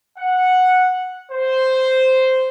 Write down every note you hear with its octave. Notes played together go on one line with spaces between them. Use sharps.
F#5
C5